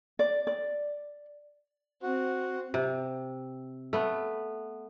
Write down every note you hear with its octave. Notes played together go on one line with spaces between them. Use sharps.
D5
D5
C4 F#4
C3
A3 B3